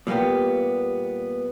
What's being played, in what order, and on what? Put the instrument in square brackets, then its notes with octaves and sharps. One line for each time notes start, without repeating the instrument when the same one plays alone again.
[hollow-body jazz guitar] A#2 G3 A#3 B3 G4